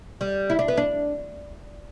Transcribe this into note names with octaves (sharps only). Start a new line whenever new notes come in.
G3
E4
D4
B3
D4